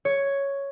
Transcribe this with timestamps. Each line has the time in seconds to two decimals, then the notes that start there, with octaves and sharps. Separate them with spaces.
0.05 C#5